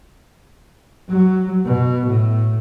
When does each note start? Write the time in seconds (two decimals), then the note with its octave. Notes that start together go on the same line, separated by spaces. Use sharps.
1.10 F#3
1.65 B2
2.08 A2